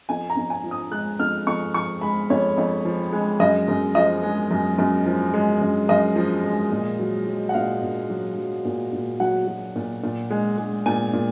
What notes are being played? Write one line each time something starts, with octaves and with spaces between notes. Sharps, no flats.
F2 G#5
A#5
F2
G#5
F3
D#6
G#3 F#6
F2 F6
F2 C#6
F3 C#6
G#3 B5
F2 C#5
F2
F3
G#3
F#2 D#5
F#2
F3 D#5
G#3
F#2
F#2
F3
G#3
F#2
F#2 D#5
F3
G#3
A#2
F#3
F#3
F#5
A#2 F5
A#2
F#3
F#3
A#2
A#2
F#3 F#5
F#3
A#2
A#2
G#3
G#3
A#2 G#5
A#2